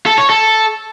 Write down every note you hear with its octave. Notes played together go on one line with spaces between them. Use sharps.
A4
C#5
A4